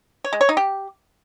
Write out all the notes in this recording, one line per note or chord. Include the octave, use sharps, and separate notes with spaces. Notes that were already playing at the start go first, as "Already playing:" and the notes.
C#5
G#3
C#5
D#4
G4